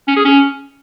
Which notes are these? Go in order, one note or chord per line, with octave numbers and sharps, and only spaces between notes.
C#4
G#4
C#4